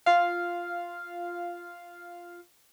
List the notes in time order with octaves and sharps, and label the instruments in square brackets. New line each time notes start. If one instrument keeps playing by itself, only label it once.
[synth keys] F4 F5